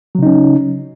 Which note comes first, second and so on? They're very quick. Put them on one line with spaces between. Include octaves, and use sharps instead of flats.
F#3 C#3 D#4 C#4